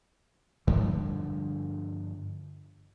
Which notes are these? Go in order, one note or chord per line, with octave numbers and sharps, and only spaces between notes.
G2 D3 F3 G3